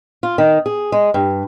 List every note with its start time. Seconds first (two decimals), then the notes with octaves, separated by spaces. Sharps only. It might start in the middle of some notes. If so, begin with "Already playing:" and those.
0.23 F4
0.38 D#3
0.66 G#4
0.92 G#3
1.14 G2